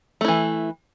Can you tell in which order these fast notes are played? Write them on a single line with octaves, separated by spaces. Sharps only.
A3 E4 E3